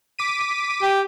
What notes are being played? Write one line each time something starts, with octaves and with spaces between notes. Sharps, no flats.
D6 B6 D#7
G4